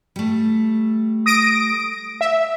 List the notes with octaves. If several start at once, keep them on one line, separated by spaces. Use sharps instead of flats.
G3 A3
D#6 A#6 D7
E5